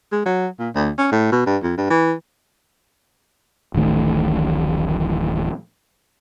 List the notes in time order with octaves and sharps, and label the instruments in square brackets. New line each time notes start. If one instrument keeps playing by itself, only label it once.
[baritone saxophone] G#3
F#3
A#2
D2
C#4
A2
B2
G2
F2
G2
E3
[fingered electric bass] D1 A1 D#3 A3